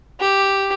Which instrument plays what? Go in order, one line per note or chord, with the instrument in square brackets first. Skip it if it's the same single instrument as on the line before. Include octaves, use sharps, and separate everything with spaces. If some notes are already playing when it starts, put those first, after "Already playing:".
[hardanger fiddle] G4